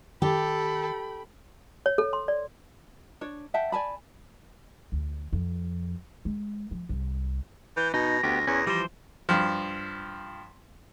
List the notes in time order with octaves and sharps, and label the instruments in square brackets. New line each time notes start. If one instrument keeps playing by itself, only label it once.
[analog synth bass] D#3 [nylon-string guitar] G4 [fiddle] A4 [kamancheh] G5 B5
[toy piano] C#5
A4
C6
D5
[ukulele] D4 C#5
E5 F#5 G5 A5
D5 G#5 A5 B5
[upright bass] D2
F2
G#3
F3
C2
[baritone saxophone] E3 [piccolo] G6
[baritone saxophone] B2 [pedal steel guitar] D#4 [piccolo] A#6
[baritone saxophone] D2 [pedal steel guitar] B3 G4
[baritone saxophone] E2 [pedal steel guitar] C#4
[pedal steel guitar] E3 F3 C5 [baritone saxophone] G3
[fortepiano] G2 F3